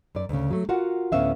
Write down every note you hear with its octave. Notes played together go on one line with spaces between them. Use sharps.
F#2 D5
D2 C#3
F#3 A3
F4 F#4 A#4 F#5
D2 A2 B3 C#4 E5 F5